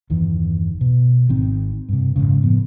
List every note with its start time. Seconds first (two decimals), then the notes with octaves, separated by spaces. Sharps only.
0.10 G1 E2 D#3
0.81 B2
1.29 G#1 D#3 C4
1.89 G2 C3
2.16 F#1 C2 G#2 C#3
2.43 F#1 A2 F3 B3